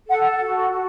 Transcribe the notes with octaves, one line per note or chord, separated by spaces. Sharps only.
A4 F#5
F#4
F#4